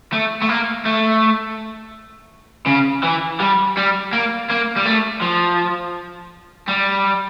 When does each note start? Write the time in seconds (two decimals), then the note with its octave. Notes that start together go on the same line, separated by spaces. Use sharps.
0.13 A3
0.42 A3
0.49 A#3
0.85 A3
2.67 C#3
3.03 E3
3.40 G3
3.77 G3
4.13 A#3
4.50 A#3
4.76 G3
4.86 A3
5.22 F3
6.68 G3